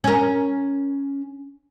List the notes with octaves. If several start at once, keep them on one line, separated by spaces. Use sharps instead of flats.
C#4 A#4